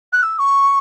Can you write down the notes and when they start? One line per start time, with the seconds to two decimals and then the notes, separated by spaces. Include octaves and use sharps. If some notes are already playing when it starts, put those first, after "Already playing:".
0.12 F#6
0.22 E6
0.38 C#6